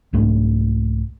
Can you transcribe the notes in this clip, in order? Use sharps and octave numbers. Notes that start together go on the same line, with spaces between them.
C2 G#2 A3 D4